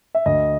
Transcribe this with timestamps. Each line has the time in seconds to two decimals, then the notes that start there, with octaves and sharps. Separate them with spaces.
0.15 E5
0.26 D2 D#5